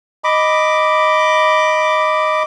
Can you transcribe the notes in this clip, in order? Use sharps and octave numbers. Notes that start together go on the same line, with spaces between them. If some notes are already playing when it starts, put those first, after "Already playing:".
D#5 B5 D6